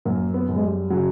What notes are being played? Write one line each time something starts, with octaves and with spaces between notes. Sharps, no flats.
F#2 A#3
B3
F#2
G#3
G3
C#3 F#3